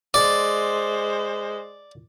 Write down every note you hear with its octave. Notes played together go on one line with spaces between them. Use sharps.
G#3 C5 D5